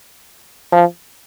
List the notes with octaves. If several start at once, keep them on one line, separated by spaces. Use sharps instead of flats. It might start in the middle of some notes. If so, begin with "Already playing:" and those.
F3